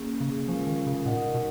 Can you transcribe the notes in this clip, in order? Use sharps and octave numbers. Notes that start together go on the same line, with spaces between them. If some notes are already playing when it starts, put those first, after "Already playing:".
Already playing: A#3 C#4 G#4
C#3
F3 G#3 C#4 F4 A#4 F5
D#3
C#3
A#2 D#4 A#4 D#5 F#5
B2